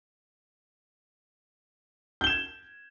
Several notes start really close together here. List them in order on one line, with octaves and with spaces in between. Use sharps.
G6 G7 E7 G#6